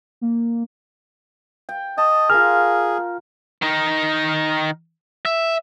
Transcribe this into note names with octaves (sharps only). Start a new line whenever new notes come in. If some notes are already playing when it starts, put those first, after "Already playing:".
A#3
G5
D#5 A5
F4 G#4 A#4 F6
D#3 D#4
E5